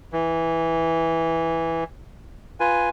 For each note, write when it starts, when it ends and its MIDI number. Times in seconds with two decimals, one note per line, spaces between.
0.13 1.84 52
2.60 2.89 65
2.60 2.89 71
2.60 2.89 80